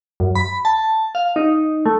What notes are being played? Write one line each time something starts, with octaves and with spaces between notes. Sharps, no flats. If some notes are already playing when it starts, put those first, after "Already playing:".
F#2
B5
A5
F5
D#4
A3